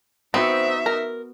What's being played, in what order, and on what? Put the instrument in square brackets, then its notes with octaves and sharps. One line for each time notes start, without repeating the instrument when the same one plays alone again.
[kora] B3 F#4 [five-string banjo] C4 [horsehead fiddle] D#4 E5
[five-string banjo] A#4